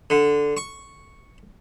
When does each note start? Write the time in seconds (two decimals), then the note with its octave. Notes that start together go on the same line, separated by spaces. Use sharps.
0.10 D3
0.57 C#6